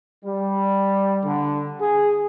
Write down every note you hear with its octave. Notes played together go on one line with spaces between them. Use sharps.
G3
D3
G#4